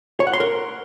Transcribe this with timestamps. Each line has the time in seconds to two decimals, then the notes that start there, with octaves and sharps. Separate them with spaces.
0.20 C#5
0.27 F#5
0.33 C6
0.40 A#4